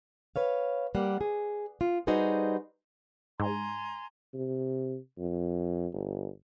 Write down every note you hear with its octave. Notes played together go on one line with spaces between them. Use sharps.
B4 C#5 F5
G3 A#3 F#5
G#4
F4
G3 D#4 F#4 G#4 B4 C5
G#2 G#5 A#5 C6
C3
F2
G1